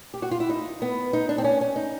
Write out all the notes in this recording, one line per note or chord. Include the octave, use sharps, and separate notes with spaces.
G4
F#4
F4
E4
D#4
B3
D#4
D4
C4
C#4
C#4
D#4